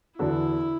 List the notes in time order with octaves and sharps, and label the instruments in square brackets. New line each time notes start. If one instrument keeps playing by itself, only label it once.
[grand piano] E2 D3 B3 F#4 A4 [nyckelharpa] E4